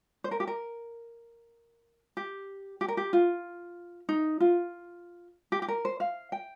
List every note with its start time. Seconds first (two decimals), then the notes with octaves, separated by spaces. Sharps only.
0.24 C5
0.31 A#4
0.40 G4
0.47 A#4
2.17 G4
2.81 G4
2.88 A#4
2.97 G4
3.13 F4
4.09 D#4
4.40 F4
5.52 G4
5.62 G4
5.68 A#4
5.85 C5
6.00 F5
6.32 G5